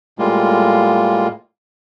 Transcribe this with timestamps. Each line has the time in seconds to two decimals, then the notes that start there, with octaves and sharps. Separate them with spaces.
0.19 A2 G3 G#3 A#3 F4